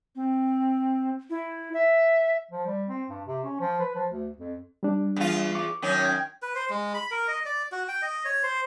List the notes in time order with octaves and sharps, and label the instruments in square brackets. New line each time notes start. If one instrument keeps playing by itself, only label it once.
[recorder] C4
E4
E5
[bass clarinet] F3
G3
C4
G2
C3
C#4
F3
B4
F3
D2
F2
[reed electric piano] G3 D4
[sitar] E2 F4
[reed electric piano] C#6 D6
[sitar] F#2 D#3 C#4
[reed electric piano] G5 G#6
[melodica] B4
C5
G#3
B5
A#4
D#5
D5
F#4
G5
D#5
C#5
C5